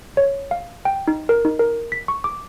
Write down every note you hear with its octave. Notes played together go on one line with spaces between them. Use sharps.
C#5
F5
G5
D#4
A#4
D#4
A#4
B6
C#6
D6